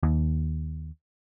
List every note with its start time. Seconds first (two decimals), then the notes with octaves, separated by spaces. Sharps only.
0.03 D#2